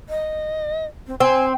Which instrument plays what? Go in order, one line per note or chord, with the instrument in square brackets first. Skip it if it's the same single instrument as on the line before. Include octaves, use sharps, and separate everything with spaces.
[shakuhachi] D#5
C4
[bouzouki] C4 [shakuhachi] G#5